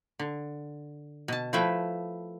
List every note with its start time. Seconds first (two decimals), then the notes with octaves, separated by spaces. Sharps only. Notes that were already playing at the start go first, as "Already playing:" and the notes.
0.19 D3
1.28 B2 A5
1.53 F3 A3 E4 B4 E5 G5